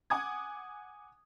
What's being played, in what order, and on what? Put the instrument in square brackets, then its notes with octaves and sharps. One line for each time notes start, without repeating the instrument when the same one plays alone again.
[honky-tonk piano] F#5 G#5 D6 D#6 G#6